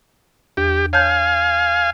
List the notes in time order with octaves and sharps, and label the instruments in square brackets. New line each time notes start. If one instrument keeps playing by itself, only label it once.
[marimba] E2 [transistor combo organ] G4
[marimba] C#5 A5 G6 [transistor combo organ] F5 G#5